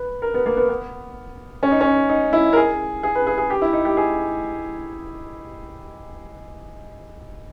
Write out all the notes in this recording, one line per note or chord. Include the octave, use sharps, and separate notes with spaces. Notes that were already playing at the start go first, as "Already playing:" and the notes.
Already playing: B4
A#4
B3
A#3
B3
B3
C#4
D#4
C#4
D#4
E4
A#4
G#4
G#4
B4
G#4
G#4
G4
E4
D#4
G4
G#4